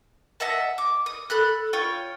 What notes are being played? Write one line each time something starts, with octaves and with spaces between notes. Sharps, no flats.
D#5 E5 F#5 A5
D6
D#6
A4 B5 F#6
F4 C#5 G5